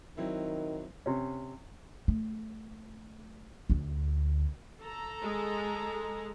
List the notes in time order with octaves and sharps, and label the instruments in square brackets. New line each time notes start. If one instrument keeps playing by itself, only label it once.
[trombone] D#3 [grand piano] F#3 C4 E4
[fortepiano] C3 C#4
[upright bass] A3
D2 D3
[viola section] A4 A#5
[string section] G#3